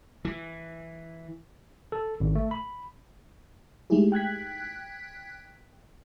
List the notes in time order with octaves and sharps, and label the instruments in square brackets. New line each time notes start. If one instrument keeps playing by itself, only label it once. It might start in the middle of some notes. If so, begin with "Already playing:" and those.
[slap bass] E3
[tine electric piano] A4
G#1
A3
B5
[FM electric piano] G#3 A3 D#4 E4 G4 G#4
G5 F#6 G#6 B6